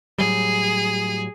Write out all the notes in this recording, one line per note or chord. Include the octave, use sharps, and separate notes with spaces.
A2 F#3 G3 G#4